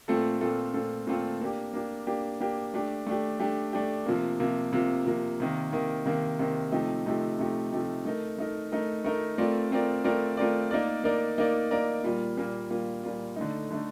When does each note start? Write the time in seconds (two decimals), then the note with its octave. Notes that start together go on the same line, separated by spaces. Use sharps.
0.08 A#2 A3 C4 F4 A4
0.41 A#2 A3 C4 F4 A4
0.74 A#2 A3 C4 F4 A4
1.07 A#2 A3 C4 F4 A4
1.41 A#3 D4 G4
1.73 A#3 D4 G4
2.07 A#3 D4 G4
2.41 A#3 D4 G4
2.74 A3 D4 G4
3.07 A3 D4 G4
3.39 A3 D4 G4
3.73 A3 D4 G4
4.06 C3 F3 A#3
4.40 C3 F3 A#3
4.73 C3 F3 A#3
5.06 C3 F3 A#3
5.40 C3 D#3 A#3
5.72 C3 D#3 A#3
6.06 C3 D#3 A#3
6.39 C3 D#3 A#3
6.72 C3 F3 A3 D#4 G4
7.06 C3 F3 A3 D#4 G4
7.39 C3 F3 A3 D#4 G4
7.72 C3 F3 A3 D#4 G4
8.05 A3 D#4 A#4
8.38 A3 D#4 A#4
8.72 A3 D#4 A#4
9.04 A3 D#4 A#4
9.38 A3 C4 F4 A#4 D5
9.71 A3 C4 F4 A#4 D5
10.04 A3 C4 F4 A#4 D5
10.37 A3 C4 F4 A#4 D5
10.71 A#3 D#4 A#4 D5
11.04 A#3 D#4 A#4 D5
11.38 A#3 D#4 A#4 D5
11.71 A#3 D#4 A#4 D5
12.04 A#2 G3 A#3 F4
12.37 A#2 G3 A#3 F4
12.70 A#2 G3 A#3 F4
13.03 A#2 G3 A#3 F4
13.36 D3 A3 D#4
13.70 D3 A3 D#4